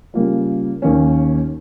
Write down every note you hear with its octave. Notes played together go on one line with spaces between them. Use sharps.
C#3 G3 A#3 F4
D#2 D#3 A#3 C#4